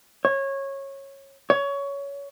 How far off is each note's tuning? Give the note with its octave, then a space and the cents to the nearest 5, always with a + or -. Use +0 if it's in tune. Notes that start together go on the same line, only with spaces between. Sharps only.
C#5 -20
C#5 +20